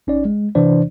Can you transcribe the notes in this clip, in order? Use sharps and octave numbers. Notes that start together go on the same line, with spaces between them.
G#1 C#4 D#4 D5
G#3
C3 E3 D4 C5 D5